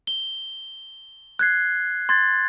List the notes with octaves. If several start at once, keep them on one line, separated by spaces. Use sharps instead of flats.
G7
F#6 G#6 C7
C6 G#6 A6